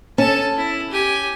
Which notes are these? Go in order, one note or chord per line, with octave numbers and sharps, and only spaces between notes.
C#4 A4 A5
E4
G4 G#5